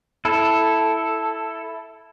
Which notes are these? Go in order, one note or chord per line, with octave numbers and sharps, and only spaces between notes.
E4 A4